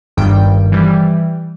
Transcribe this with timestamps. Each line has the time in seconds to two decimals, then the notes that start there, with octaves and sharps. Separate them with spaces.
0.17 G1 G2 D#3 G3 G5
0.72 E3 G3